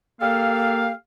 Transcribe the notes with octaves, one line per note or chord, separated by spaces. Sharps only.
A#3 G4 A4 F5